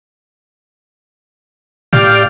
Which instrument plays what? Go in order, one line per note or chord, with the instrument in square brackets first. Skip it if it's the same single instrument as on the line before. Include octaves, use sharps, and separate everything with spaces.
[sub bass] A2 [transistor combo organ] G4 D5 F5